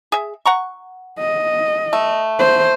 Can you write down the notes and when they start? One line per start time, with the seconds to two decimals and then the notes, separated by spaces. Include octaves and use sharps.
0.12 G#4 E5
0.46 F#5 A#5 C#6
1.20 D#5
1.93 A3
2.39 C5